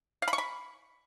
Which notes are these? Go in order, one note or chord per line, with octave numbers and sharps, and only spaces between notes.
F5
B5
C#6
B5